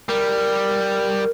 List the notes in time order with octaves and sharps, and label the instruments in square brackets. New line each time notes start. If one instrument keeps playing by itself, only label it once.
[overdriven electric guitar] G3 [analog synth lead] A#4